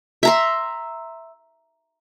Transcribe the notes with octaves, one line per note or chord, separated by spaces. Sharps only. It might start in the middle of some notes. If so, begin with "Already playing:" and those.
E5 A#5 C6